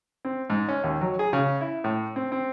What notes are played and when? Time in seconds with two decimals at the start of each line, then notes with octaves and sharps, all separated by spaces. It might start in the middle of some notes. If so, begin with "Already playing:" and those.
0.25 C4
0.50 G#2
0.69 C#4
0.84 D#2
1.01 F#3
1.19 G#4
1.33 C#3
1.61 E4
1.84 A2
2.16 C4
2.32 C4